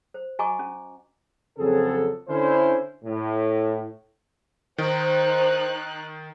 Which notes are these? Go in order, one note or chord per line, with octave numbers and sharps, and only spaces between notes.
C5
F#4 D#5 G#5 A#5 C#6 D6
C#4
F2 C#3 F#3 C4 G#4 A4
D3 C#4 E4 C5
A2
D#3 D#4 C5 F#6